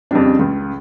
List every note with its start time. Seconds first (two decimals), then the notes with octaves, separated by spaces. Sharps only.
0.11 F2 C#3 G3 D4
0.39 C#2